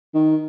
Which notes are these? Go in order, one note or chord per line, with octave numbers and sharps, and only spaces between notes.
D#3